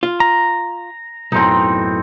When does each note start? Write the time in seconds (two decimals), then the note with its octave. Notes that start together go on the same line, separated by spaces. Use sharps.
0.03 F4
0.20 A#5
1.32 B1 F#2 A2 C4 D#4